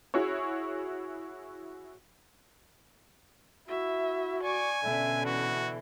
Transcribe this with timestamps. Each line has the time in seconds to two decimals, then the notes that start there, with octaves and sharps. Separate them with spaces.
0.14 E4 F#4 G#4 C#5
3.69 E4 F#4 E5
4.43 D5 G#5 C#6
4.84 B2 D3 C#4 E5
5.25 E3 F#4